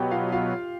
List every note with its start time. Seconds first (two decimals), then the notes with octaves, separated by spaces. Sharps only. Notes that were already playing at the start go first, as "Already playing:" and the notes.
Already playing: B2 F#3 B3 G4 G5
0.11 F4 F5
0.32 F4 F5